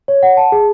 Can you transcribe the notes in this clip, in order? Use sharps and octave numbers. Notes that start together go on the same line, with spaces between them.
C#5
F#5
A5
G#4